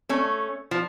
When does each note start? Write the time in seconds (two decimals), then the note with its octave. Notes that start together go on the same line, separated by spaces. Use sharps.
0.09 A3 C#4
0.71 F3